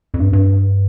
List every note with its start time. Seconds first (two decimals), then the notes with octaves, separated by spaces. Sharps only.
0.14 F2
0.20 G2
0.33 G2